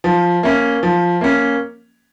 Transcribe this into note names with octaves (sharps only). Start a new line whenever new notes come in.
F3
A#3 C#4
F3
A#3 C#4